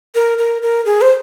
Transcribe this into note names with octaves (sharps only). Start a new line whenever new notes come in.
A#4
A#4
A#4
G#4
C5